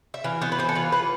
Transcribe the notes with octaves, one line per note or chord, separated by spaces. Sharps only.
E5
E3 F5
B3 C5
B4
E3 C5
A4
F4 B4
E3 B4